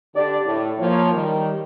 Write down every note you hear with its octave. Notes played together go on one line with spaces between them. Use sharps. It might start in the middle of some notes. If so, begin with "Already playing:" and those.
D3 D4 G4 D5
A2
F3 A#3 C#5
D#3 G3